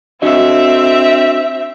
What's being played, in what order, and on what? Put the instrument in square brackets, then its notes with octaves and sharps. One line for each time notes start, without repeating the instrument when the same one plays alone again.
[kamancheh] C4 E5 [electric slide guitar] D4 F#4 D#5